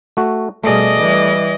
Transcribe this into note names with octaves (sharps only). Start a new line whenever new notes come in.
A3 F#4
B2 G3 A3 G#4 D5 D#5
E3 G3